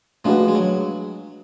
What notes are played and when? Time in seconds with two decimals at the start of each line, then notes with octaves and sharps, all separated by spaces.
0.25 F3 G#3 A3 D4 F#4 B4
0.48 G#3
0.55 F#3